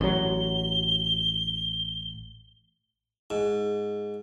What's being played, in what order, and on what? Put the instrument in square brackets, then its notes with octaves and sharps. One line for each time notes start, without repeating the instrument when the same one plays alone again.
[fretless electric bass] A1 F#3 [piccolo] G7
[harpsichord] G#2